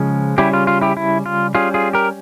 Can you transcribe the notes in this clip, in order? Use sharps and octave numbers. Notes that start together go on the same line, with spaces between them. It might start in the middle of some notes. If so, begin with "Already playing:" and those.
Already playing: C#3 F3 G#3 C#4
C#3 G3 C#4 E4 G4
F4
F4
E4 G4
E4
F4
G3 C#4 F4 G#4
F4 G#4
G4 A#4